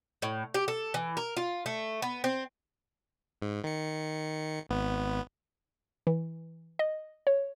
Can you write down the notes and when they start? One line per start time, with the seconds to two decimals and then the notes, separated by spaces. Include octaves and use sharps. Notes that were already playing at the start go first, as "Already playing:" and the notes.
0.22 A2
0.54 G4
0.68 A4
0.94 E3
1.17 A#4
1.37 F4
1.66 A3
2.02 B3
2.24 C4
3.42 G#2
3.64 D#3 C#7
4.69 G#1 B3
6.07 E3
6.79 D#5
7.27 C#5